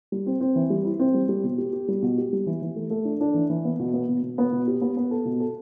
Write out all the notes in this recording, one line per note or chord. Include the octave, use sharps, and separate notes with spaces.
G3
C4
C4
E3
G3
E4
C4
G3
G3
B2
G4
G4
G3
B2
G4
G3
E3
E3
A3
A3
D4
D4
E3
E3
B3
B2
B3
B2
B2
B3
B2
G4
B3
B3
A4
B2
A4